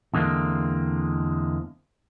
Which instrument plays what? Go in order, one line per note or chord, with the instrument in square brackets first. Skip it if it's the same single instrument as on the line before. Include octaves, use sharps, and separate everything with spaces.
[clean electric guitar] E2 D3 G#3 A#3 C4